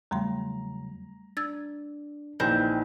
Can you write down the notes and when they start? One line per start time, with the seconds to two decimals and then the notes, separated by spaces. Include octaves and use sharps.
0.11 E2 C#3 F#3 G3 A3 A#5 C6
1.37 D4 E6 G#6 A6
2.40 A#1 D#3 E3 C4 G5 B5 A#6